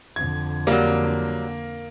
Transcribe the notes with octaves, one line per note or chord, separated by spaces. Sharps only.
F2 D3 G#6
F#3 G3 A#3